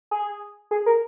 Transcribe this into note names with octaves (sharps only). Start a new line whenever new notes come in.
G#4
G#4
A#4